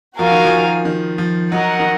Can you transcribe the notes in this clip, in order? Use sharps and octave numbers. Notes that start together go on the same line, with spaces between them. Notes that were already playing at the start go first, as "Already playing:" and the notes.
F3 F#4 A#4 F5 G#5
D#3
F3
D#3
F3
F#3 D#4 A#4 D#5 F#5
D#3